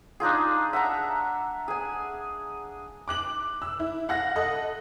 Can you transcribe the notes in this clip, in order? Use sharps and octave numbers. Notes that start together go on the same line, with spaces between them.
D4 D#4 F4 G#4
E5 F#5 A5 A#5
G#4 G#5
D6 F#6 F#7
E6
E4
F5 F#5 F#6 A#6
A4 D#5 F#6